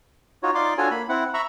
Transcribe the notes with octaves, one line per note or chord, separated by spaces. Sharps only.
D#4 F4 F#4 C#5
D#4 F4 D5 C6 D6
D4 F4 F#4 A4 C#5 G#5
A#3 B5
C4 E4 F#5
E5 A#5 B5 C#6